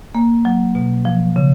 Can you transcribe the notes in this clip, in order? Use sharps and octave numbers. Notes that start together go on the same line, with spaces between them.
A#3
F#3
B2
F3
C#3